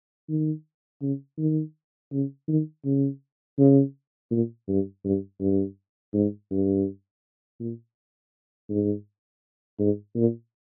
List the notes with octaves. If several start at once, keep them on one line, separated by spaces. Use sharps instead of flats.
D#3
C#3
D#3
C#3
D#3
C#3
C#3
A#2
G2
G2
G2
G#2
G2
A#2
G#2
G#2
A#2